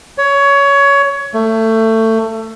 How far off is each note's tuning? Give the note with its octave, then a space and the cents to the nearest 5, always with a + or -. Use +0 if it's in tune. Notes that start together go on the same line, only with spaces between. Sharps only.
C#5 +20
A3 +20